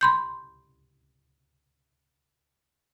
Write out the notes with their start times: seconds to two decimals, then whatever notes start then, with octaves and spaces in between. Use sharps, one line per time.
0.01 B5 C6 G6